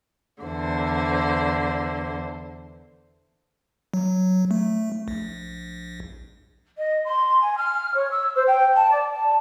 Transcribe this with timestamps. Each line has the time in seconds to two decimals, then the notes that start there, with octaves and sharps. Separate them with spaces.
0.43 E2 D3 C5
3.94 F#3
4.51 A3
5.08 A#1
6.77 D#5
7.05 C6
7.40 G#5
7.57 F6
7.94 C#5
8.11 E6
8.35 C5
8.47 G5
8.75 A5
8.90 D5
9.12 A5